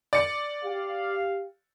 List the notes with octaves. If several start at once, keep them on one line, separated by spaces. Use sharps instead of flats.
D5 C#7
G4 F5